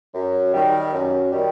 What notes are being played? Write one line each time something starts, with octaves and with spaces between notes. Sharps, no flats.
F#2
D#3 G3
F#2
D#3 G3